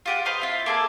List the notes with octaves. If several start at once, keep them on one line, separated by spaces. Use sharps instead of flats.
F4 G4 F#5
B4 C5 D#5 F5
E4 F4
A#3 G#4 A4